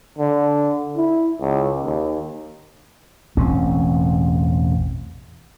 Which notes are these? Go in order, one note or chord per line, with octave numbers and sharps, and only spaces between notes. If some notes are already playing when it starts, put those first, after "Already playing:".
D3
E4
C#2
D#2
E1 A1 C4 C#4